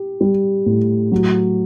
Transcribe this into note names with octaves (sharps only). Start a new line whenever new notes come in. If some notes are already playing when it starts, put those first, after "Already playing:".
Already playing: G4
G3
A2
F#3